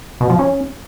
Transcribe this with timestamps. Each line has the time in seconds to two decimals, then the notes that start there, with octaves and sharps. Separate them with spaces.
0.21 B2
0.30 F3
0.39 C#4